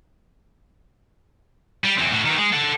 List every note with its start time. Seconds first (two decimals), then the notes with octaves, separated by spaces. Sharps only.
1.84 G3
1.98 E2 C4
2.11 A2 F#4
2.25 D#3 E3
2.38 G#3
2.52 A4 F#5